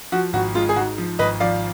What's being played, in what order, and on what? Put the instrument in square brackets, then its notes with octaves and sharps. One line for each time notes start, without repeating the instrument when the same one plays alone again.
[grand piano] F3 F#4
G#1 F#4
G#3 F4
G#4
G#2 F#4
F3
G#1 B4 D#5
F3 D5 F5